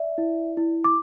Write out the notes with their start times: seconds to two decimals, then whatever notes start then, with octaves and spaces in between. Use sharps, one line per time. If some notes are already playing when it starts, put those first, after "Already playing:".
Already playing: D5 E5
0.18 E4
0.57 E4
0.84 D6